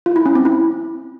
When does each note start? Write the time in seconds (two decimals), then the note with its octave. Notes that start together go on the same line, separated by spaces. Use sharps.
0.06 F4
0.16 E4
0.26 C#4
0.35 C4
0.45 E4